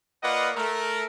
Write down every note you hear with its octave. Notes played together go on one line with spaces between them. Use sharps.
A#3 F4 B4 D5 D#5 F#5
A3 A#4